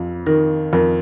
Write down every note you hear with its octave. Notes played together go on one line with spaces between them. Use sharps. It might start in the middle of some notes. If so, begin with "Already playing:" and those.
Already playing: F2
D#3 A#4
F2 A#4